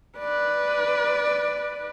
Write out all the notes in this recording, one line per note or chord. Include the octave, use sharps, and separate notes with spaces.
B4 D5